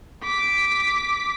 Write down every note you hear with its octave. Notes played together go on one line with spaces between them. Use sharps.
D6 B6